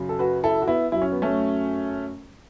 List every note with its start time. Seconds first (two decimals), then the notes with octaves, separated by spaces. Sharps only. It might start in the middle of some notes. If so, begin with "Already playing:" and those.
Already playing: F#2 C#3 F#3
0.09 A4
0.19 F#4 B4
0.44 E4 A4
0.62 F#4
0.68 B3 E4
0.92 F#2 F#3 E4
1.02 C#4
1.12 B3
1.22 A3 C#4